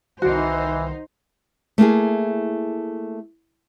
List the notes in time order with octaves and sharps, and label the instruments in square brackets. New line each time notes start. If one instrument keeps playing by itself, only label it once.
[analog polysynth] C2 D#3 [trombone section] E3 [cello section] D#4 C5 [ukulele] F#4
[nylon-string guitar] A3 A#3 E4 G#4